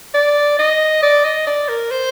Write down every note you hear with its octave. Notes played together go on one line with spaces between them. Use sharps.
D5
D#5
D5
D#5
D5
A#4
C5